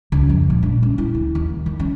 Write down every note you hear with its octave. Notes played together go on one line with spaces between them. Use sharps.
C#2
F2
A#2
D4
C#4
E4
D2
D#2
D#3
C#4